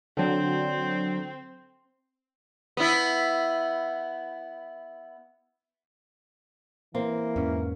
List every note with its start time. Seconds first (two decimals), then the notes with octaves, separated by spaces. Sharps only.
0.17 D3 F#3 C4
2.77 B3 E4
6.95 E3 A#3 C4
7.36 E2 G#2 C#4